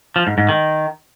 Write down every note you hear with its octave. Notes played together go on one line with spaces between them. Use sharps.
F3
G#2
G#2
D#3